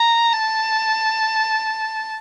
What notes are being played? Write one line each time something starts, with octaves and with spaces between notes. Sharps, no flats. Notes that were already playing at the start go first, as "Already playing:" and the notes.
Already playing: A#5
A5